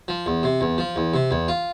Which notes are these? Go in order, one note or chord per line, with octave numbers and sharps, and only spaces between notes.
F3
E2
C3
E2
F3
E2
C3
E2
F4